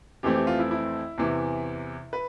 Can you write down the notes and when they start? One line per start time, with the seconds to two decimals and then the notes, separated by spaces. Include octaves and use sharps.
0.23 F2 E3 A3 C4 G4
0.35 G4
0.47 F4
0.59 E4
0.71 E4
1.18 E2 C3 E3
2.13 B4